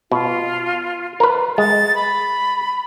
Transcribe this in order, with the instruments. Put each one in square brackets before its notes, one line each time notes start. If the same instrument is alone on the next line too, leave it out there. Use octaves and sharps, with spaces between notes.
[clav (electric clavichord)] B2 [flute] F4
[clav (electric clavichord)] A#4 B4
[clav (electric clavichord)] G#3 [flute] A6
[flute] B5